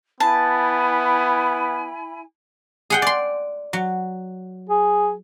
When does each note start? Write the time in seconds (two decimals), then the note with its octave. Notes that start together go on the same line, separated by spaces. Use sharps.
0.20 B3 E4 G#5 A5 B5
2.90 G#4 F#5 G5
3.02 D5 C6
3.73 F#3
4.69 G#4